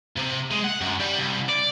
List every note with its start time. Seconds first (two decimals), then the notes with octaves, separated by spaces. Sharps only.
0.16 C3
0.51 G#3
0.64 F#5
0.81 F#2
1.00 G3
1.18 C2
1.49 D5